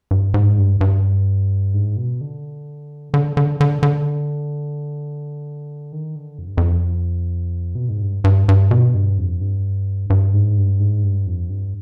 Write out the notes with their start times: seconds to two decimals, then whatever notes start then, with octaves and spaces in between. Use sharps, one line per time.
0.11 G2
0.34 G#2
0.58 G2
0.81 G2
1.74 G#2
1.97 B2
2.21 D3
3.14 D3
3.37 D3
3.61 D3
3.83 D3
5.92 D#3
6.16 D3
6.38 F2
6.48 G2
6.57 F2
7.75 B2
7.89 G#2
8.01 G2
8.24 G2
8.49 G2
8.71 B2
8.94 G2
9.18 F2
9.41 G2
10.10 G2
10.34 G#2
10.57 G2
10.80 G#2
11.04 G2
11.27 F2
11.49 G2